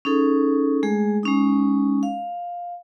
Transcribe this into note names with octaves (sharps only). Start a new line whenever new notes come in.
C#4 D#4 G#4 A4
G#3 A3 G#4
G#3 C#4 D#4
F5